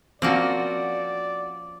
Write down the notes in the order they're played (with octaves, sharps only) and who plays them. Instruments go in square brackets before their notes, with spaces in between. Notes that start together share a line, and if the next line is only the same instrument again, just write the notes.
[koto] F3 A#3 C#4 [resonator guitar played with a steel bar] C4 F#4 [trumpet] D5